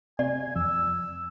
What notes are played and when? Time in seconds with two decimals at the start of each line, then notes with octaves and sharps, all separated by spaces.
0.19 C3 D5 G#5
0.55 F2 E6